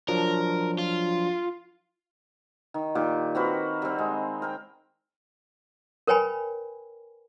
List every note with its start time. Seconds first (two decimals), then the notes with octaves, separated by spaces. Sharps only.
0.08 F3 F#3 D4 A#4
0.79 F4
2.74 D#3
2.95 A#2 D#3 G4 D6
3.35 C4 F#4 A#4 B4
3.82 G3 C4
3.99 G#3
4.42 A#4 G5
6.07 A#4 B4 C#5 G5 G#5 B5